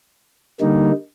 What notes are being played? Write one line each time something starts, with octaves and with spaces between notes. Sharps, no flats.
D3 G3 A#3 D#4